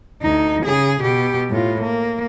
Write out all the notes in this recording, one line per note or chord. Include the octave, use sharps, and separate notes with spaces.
D2 D#4
C#3 G#4
B2 G4
A2 F4
A#3